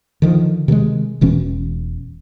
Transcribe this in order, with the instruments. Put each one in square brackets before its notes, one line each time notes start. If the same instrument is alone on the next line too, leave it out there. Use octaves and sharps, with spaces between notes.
[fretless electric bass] D3 D#3 F3
C3 D#3 F3 G#3
E1 B2 E3 C#4